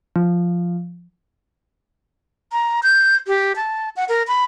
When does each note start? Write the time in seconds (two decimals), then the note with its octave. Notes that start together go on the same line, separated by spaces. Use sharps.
0.16 F3
2.52 A#5
2.83 G6
3.27 G4
3.56 A5
3.96 F#5
4.09 A#4
4.28 B5